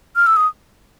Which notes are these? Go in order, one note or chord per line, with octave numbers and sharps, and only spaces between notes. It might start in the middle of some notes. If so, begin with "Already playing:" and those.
F6
E6
D#6